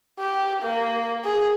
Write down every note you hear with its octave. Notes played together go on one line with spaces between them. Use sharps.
G4
A#3
G#4